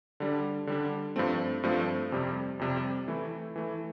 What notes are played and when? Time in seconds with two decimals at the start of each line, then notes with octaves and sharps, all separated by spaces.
0.20 D3 G3 D4
0.67 D3 G3 D4
1.16 G2 F3 A3 C4
1.63 G2 F3 A3 C4
2.12 F2 C3 G3
2.59 F2 C3 G3
3.08 E3 A3 E4
3.56 E3 A3 E4